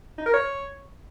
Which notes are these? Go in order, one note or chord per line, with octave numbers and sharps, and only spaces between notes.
D#4
A#4
C#5